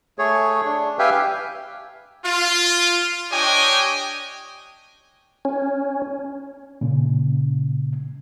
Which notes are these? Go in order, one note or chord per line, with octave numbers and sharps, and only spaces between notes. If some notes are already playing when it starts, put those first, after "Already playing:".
A3 G#4 C#5
D4
G4 B4 E5 F5 G5 G#5
F4
D4 G4 C#5 D#5 G5 G#5
C#4
A#2 C#3